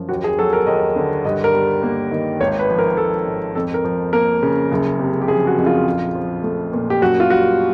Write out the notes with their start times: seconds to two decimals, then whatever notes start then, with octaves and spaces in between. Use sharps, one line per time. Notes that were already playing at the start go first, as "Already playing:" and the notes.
Already playing: F#2 F3
0.09 D#2 F#4
0.24 G#4
0.38 F#3 A4
0.53 A#4
0.67 D#2 D#5
0.96 D3
1.25 G2 D#5
1.44 A#4
1.54 G3
1.83 A#3
2.11 D#3
2.40 G#1 C#5
2.59 B4
2.69 F3
2.79 A#4
2.97 G#1 A4
3.27 G#2
3.55 F2 A4
3.74 A#4
3.84 F3
4.13 A#3 A#4
4.43 C#3
4.71 F#1
4.99 C3
5.22 G4
5.28 F3 G#4
5.47 F#4
5.58 F2
5.66 F4
5.86 A#1
6.15 F3
6.43 A3
6.73 A#2
6.90 G4
7.01 F#2 F#4
7.20 F4
7.30 G3 F#4